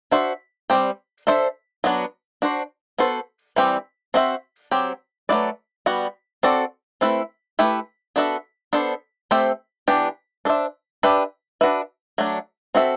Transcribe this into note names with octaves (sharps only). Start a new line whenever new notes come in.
D4 F#4 C5 E5
G3 C4 G4
D4 A4 C5 E5
F#3 B3 D4 F#4
D4 F#4 C5
B3 F#4 A4 C5
E3 G3 C4 G4
C4 F#4 C5 E5
F#3 C4 G4
F#3 A3 E4 B4 D5
G3 B3 F#4
C4 F#4 A4 D5
A3 C4 E4 B4 E5
A3 E4 G4 B4
B3 D4 F#4 A4 E5
B3 D4 A4 C5
A3 C4 G4 C5 E5
E3 B3 D4 G4
D4 A4 C5 E5
D4 G4 B4 E5
D4 F#4 B4 E5
F#3 A3 D4
C4 F#4 A4 E5